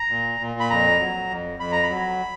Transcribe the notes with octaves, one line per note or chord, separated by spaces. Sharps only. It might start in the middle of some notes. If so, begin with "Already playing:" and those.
Already playing: A#5
A#2
A#2
B5
F2 A#5
F#3
F2
F2 B5
A#5
B5
F#3